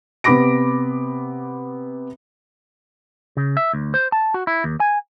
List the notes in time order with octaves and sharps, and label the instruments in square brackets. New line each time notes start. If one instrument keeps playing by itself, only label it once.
[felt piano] C3 B3 B5 D6 A#6 D7
[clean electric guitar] C#3
E5
D2
C5
A5
F#4
E4
D#2
G#5